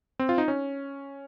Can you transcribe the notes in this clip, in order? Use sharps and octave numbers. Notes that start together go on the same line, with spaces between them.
C4
F4
D#4
C#4